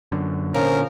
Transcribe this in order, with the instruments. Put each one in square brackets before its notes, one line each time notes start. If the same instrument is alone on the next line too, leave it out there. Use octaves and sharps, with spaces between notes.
[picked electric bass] F#2 D3
[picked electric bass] A#2 D3 [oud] F3 [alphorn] C#4 [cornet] A#4